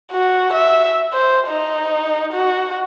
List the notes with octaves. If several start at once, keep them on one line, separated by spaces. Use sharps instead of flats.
F#4
E5
C5
D#4
F#4